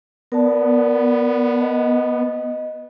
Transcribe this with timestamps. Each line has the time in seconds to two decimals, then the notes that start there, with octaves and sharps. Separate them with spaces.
0.32 B3 A#4 D5 A5
1.61 D#5